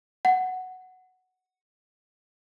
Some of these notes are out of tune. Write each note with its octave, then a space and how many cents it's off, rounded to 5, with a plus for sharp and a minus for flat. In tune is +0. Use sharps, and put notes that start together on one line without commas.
F#5 +0